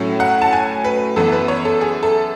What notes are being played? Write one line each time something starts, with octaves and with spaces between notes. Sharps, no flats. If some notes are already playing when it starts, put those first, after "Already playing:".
Already playing: A2 F#3 A3 C#4
F#5
A5
G#5
B4
F#2 E3 B3 E4 A4
B4
C#5
A4
G#4
A4